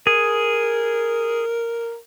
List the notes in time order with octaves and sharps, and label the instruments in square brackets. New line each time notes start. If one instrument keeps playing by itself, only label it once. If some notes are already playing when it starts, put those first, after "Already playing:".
[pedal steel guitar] G#4 [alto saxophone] A#4